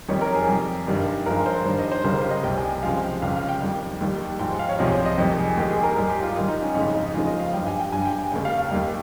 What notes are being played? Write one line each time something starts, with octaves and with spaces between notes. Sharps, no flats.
F2 D#3 G3 C#5
A#4
G#4
F2 C3 G3
G2 D#3 G3
G2 F3 G#3 A#4
C5
G2 D#3 G3 C5
D#5
C5
C#2 C#3 G3 A#4
C5
D#5
C2 C3 G3 G5
G#5
C#2 C3 F3 G#3 F5
G5
C#2 C#3 G3 F5
F5
G5
F2 D#3 G3
D#2 D#3 G3
G#2 F3 G#3 G5
F5
C#5
C2 C3 F3 G#3 D#5
C5
D#5
F2 D#3 G3
G#4
D#2 D#3 G#3 G4
G#4
A#4
G#2 G3 G#4
G4
F4
G#2 D#3 G3 D#4
D#4
C#4
F2 C#3 G#3 D#4
D#4
D#4
D#2 C#3 F3 G#3 F4
D#5
F5
G2 G3 G5
G#5
G5
G2 G3 G#5
G5
G#5
D#2 C#3 G#3 G5
F5
F5
D#2 D#3 G3 D#5